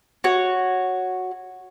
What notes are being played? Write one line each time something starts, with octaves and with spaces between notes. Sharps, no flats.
F#4 C#5